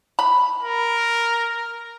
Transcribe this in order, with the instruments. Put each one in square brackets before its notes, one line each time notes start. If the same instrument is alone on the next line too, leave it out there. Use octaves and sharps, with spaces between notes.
[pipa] B5
[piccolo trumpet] A#4